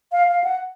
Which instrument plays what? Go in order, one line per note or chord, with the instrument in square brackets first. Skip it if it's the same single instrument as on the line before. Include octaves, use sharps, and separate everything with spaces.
[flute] F5
F5
F#5